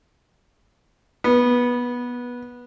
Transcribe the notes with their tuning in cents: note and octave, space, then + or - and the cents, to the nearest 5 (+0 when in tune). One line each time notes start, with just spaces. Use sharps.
B3 -15